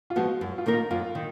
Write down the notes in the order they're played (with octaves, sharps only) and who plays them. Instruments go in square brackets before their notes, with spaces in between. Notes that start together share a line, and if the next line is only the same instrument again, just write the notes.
[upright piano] F4
[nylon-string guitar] F3 G#3 B3 [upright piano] F#4
[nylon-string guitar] F#2
[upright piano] F4
[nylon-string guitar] D#3 A#3 D#4 A#4
[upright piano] F4
[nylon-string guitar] F#2 [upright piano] F4
[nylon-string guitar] D#3